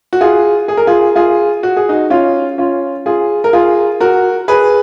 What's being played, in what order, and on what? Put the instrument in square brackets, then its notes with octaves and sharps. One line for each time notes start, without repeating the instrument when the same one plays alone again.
[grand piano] F#4
F4 G#4
G#4
A#4
F4 G#4
F4 G#4
F#4
G#4
D#4 F#4
C#4 F4
C#4 F4
F4 G#4
A#4
F4 G#4
F#4 A#4
G#4 B4